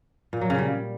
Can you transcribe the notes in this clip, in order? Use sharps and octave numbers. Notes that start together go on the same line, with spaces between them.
A#2
F#3
C#3
G3